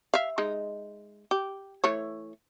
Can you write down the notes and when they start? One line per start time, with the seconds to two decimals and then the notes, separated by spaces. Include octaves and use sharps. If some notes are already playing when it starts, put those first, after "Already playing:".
0.14 E5 F5
0.38 G#3 D#4
1.31 G4
1.84 E3 A3 C#5